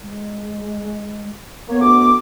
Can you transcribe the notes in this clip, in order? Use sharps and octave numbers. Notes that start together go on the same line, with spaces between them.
G#3
A#3 B3 C#5
D2 D6